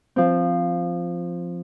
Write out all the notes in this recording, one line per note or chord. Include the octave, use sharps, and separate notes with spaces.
F3 C4